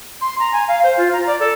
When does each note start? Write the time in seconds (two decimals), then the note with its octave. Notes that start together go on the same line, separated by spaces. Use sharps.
0.21 C6
0.40 A#5
0.53 G#5
0.68 F5
0.83 C5
0.97 F4
1.13 A#5
1.27 D5
1.40 A4